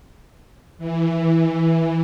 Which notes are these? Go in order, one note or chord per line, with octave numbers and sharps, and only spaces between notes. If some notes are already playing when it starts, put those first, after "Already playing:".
E3